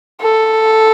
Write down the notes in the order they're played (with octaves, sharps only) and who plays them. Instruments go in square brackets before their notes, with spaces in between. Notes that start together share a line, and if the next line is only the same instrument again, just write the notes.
[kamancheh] A4